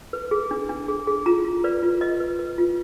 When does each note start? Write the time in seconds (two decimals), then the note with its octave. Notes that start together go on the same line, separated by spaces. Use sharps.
0.13 B4
0.31 G#4
0.51 D4
0.69 D4
0.88 G#4
1.07 G#4
1.26 F4 A#5
1.44 F4
1.64 B4 D5
1.83 F4
2.01 B4 D#5
2.20 B4
2.39 B4
2.58 F4